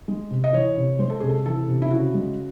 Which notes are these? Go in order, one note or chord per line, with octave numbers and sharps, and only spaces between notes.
G#3
C3
D#5
E3 C#5
C3
G#3 C5
A4
C3 G#4
A4
E3 A4
C3
E4
C#3 F#4
G#3